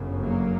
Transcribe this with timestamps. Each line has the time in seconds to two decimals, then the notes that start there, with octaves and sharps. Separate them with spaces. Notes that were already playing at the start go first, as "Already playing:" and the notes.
Already playing: G1 F#2 C#3
0.20 F#3 A#3